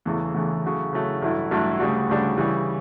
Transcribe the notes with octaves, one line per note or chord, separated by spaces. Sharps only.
E2 C#3 E3 A3
E2 C#3 E3 A3
C#3 F#3 A3
C#3 F#3 A3
A1 G2 F#3 A3 E4
A1 G2 F#3 A3 E4
D2 C#3 G3 D4 F#4
D2 C#3 G3 D4 F#4
C#3 E3 G3